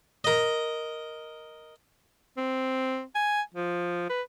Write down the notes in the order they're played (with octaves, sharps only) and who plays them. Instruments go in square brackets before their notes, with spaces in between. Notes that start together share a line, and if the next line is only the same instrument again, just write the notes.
[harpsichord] A#4 D#5
[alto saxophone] C4
G#5
F3
B4